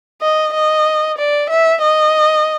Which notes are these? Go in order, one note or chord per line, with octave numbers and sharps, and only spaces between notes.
D#5
D#5
D5
E5
D#5